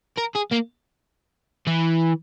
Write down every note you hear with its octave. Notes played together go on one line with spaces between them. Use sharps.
A#4
G#4
A#3
E3